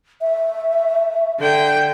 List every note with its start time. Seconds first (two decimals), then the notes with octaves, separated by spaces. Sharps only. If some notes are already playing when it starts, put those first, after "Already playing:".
0.21 E5
1.39 D3 G5